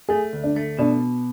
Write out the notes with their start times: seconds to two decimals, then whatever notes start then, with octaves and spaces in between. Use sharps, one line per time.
0.09 A3 G#4
0.33 D2
0.44 D4
0.56 A3
0.79 B2 D4